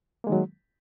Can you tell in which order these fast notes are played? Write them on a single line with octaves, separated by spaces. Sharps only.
A#3 G#3 D#3 F#3